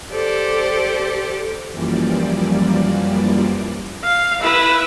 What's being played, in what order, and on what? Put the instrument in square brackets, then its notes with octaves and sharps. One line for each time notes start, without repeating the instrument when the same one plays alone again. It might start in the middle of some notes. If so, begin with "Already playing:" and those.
[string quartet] G4 A4 C5 D5
[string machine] F#2 E3 F3 G3 A#3 D5
[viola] F5
E4 B4